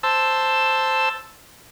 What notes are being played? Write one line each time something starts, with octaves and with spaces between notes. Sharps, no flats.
C5 A5 E6